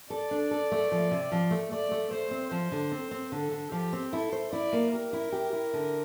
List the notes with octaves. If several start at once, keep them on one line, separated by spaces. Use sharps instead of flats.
A4 D5
D4
A4
A3
F3
C3
F3
A3
A3 D5
A3
A3 C5
C4
F3 C5
D3
C4
C4
D3 A4
D3
F3 G4
C4
E4 A4
C5
E4 D5
A#3
G4 A#4
E4
G4
E4
D3